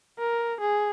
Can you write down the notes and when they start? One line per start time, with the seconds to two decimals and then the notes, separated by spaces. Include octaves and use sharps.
0.19 A#4
0.60 G#4